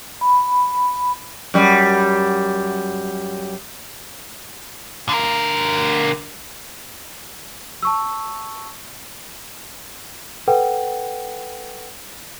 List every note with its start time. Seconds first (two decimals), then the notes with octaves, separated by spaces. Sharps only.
0.21 B5
1.54 F#2 G3
5.09 D3 A#4
7.82 A5 C#6 E6
10.48 A4 B4 F#5 G5